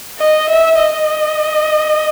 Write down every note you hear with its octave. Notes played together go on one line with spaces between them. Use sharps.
D#5
E5
D#5